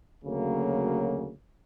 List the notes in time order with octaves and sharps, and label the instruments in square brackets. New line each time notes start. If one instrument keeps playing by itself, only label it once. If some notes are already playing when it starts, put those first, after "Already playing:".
[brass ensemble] D2 C#3 F#3 A#3